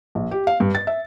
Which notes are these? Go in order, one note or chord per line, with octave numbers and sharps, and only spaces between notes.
A#1
G4
F5
G2
A6
E5